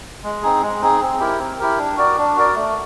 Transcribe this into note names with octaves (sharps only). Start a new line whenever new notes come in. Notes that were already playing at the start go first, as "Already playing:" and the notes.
G#3
C4 D#4 G#4
G#3
C4 D#4 G#4
C4
E4 G4 A#4
C4
E4 G4 A#4
D4
F#4 A#4 D5
D4
F#4 A#4 D5
A3